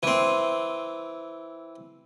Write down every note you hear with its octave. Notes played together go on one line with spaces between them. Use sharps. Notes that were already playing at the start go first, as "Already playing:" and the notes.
E3 C4